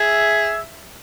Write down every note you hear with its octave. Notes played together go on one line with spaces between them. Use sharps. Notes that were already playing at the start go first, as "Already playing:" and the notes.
Already playing: G#4 E5